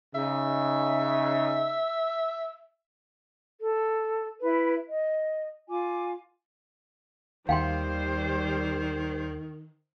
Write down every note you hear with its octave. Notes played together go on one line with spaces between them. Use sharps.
C#3 D#4 E5
A4
E4 B4
D#5
F4 G#5 D6
D#2 D#3 G3 C5 F5 G5 C6